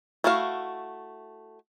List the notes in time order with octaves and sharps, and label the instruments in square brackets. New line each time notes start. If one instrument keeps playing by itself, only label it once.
[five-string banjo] A3 E4 F#4 F5